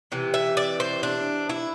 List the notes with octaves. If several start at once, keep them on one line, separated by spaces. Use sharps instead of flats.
C3 E3
E5
D5
C5
D4
E4